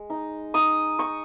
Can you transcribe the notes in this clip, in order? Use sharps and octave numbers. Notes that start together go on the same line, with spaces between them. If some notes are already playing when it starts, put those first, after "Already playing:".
Already playing: G#3
D#4
D#4 D#6
D#4 C#6